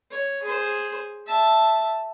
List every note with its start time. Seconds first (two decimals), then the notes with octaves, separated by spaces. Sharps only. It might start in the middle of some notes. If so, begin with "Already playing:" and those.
0.11 C#5
0.42 G#4 C5
1.27 E5 A5